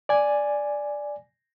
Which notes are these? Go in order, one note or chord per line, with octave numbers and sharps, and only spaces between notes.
D5 G#5